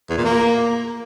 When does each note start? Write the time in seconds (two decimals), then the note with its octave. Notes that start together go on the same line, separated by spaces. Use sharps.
0.10 E2
0.17 A#2
0.25 A#3